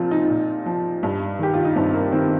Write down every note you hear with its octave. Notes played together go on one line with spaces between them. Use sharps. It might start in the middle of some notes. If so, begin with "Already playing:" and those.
Already playing: A#2 F3 C4 F4
D#4
A#2
F3
G2
D#3 G4
F4
D#4
G2 C4
A#3
D#3 C4